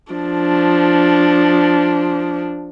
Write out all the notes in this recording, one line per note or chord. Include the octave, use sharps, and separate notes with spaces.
F3 D4